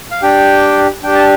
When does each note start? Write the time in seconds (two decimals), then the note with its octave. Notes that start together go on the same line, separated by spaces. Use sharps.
0.11 F5
0.22 D4 G4 G5
1.03 D4 G4 G5
1.15 A5